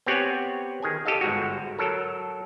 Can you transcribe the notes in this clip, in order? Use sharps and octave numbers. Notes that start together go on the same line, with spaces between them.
B3 C4 G4 C#5 F#5 G#5
D#3 G#4 G#5
G4 A4 D#5 F5
G1 G#2 F#4
F#3 A4 A#4